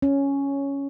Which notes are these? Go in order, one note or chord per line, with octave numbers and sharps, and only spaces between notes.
C#4